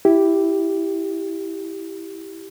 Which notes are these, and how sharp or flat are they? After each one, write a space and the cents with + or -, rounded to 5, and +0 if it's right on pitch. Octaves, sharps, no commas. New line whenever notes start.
E4 +0 G4 +0